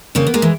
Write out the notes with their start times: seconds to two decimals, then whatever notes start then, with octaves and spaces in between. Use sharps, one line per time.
0.15 C#3 A#3 C4
0.27 B3
0.34 G#3 A#3
0.42 E3